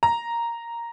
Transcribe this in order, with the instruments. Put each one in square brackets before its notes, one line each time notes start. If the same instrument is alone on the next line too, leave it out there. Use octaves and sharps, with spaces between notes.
[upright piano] A#5